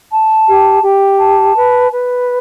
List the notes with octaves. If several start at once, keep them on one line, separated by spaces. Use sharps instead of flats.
A5
G4
G4
A5
B4
B4